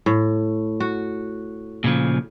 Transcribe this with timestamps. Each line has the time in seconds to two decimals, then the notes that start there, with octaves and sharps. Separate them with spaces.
0.06 A2
0.80 F#4
1.84 A#2 C#3 F3